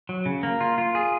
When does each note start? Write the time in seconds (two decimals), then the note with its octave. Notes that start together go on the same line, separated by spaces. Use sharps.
0.09 F#3
0.26 C#3
0.43 A#3
0.61 F4
0.78 F4
0.95 G#4